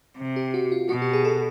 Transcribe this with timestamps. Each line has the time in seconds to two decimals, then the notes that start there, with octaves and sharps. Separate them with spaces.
0.18 C3
0.36 G4
0.54 F#4
0.72 F4
0.89 B2 F#4
1.02 G4
1.13 G#4
1.25 A4